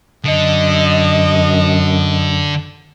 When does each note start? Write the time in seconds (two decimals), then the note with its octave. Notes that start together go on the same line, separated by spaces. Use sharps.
0.25 F#2 D3 D#5